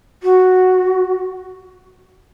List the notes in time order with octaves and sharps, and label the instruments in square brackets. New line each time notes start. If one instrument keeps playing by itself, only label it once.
[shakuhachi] F#4